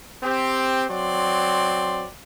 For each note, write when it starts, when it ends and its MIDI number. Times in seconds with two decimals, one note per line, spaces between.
0.23 0.84 60
0.23 0.84 67
0.89 2.07 54
0.89 2.07 60
0.89 2.07 74
0.89 2.07 84